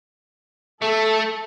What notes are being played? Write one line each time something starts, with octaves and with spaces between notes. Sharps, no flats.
A3 A4